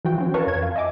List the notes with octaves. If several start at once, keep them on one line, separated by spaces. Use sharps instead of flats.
E3 F3 F#4 G5
C4 C#4
A#4 B4 C#5 F5 A5 C#6
F2 G#6
F4
D#5 E5 G#5 D6